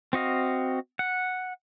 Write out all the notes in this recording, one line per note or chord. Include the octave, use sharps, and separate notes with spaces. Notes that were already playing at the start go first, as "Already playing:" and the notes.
C4 F#4 D#5 F5
F#5